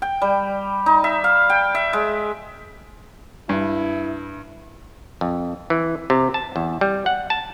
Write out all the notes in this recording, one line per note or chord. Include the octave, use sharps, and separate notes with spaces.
G5
G3
D#4
E5
F5
G5
E5
G#3
G2 E4
F2
E3
C3
A5
E2
G3
F#5
A5